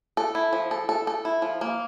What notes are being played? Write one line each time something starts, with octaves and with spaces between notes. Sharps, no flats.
A4
E4
F3
A4
A4
A4
E4
F3
A#3